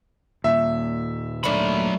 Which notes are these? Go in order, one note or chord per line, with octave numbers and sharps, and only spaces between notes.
D#2 A#2 E5
F#2 F#3 A3 D4 B5